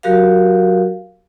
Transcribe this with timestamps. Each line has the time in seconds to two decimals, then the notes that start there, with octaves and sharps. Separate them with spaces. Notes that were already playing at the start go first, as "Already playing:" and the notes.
0.03 F#3 F#4 G4 A#4 F5